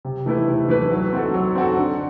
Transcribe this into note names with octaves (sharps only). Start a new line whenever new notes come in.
C3
E3 A3 E4 B4
C3
E3 A3 E4 B4
F#3
C4 F#4 A4
F#3
C4 F#4 A4
D3